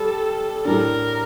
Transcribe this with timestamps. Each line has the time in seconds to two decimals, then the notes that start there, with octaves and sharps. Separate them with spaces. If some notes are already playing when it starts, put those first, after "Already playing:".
Already playing: G3 A4
0.65 A2 G3 D4 A#4